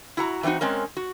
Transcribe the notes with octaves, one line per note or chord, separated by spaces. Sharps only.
E4 F#4 A#5
E3 C4 C#4 D#4 F#4
G#3 C4 C#4 A#4
F#4